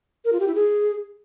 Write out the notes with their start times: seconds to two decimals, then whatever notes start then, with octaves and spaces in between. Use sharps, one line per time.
0.25 A#4
0.32 F4
0.40 G4
0.48 E4
0.55 G#4